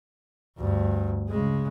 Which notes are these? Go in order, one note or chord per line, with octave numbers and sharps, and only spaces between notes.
D2 G2
C#3 G#3